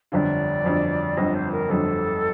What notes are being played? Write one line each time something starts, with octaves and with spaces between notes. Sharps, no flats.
G1 F2 D3 D5 F5
G1 F2 D3
G1 F2 D3 D#5
C5
A#4
G1 F2 D3 A4